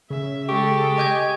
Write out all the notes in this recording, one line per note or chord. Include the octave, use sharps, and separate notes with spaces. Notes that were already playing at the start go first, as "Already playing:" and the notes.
C#3 E5
G#3 G4 A4 C#6
D#5 G#5 D6 G6 G#6